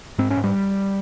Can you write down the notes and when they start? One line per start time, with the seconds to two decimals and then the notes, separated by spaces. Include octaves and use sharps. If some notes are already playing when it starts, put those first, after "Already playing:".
0.18 G#2 C4
0.31 C#4
0.37 G#2
0.44 G3